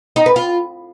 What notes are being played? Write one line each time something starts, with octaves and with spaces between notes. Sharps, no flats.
D#4
B4
F4